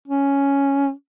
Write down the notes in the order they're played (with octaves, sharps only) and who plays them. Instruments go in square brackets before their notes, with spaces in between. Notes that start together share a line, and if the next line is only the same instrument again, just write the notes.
[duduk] C#4